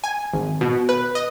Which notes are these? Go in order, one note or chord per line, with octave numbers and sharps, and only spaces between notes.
G#5
G#1
B2
B4
D#5